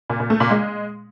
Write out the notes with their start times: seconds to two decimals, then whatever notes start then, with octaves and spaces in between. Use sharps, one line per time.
0.10 A#2
0.20 A#2
0.30 A3
0.40 A#2
0.51 G#3